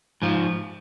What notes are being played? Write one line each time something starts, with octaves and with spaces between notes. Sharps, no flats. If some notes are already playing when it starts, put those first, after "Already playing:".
G#2 F3